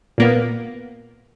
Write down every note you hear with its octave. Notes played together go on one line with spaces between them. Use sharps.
A#2 A#3 B3